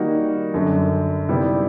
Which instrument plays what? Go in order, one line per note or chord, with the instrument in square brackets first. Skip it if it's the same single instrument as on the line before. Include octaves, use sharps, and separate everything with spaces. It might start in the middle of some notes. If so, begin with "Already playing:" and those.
Already playing: [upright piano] D#3 G3 A#3 D#4 F#4
F#2 D3 F#3
C3 D#3 G3 B3 E4